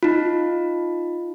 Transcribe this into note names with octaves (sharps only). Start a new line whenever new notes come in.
D#4 F4